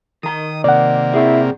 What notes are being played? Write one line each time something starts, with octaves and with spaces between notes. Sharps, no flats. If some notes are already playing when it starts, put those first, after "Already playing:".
D#3 A#5 D#6
C3 A#3 D5 F#5
C4 E4 G#4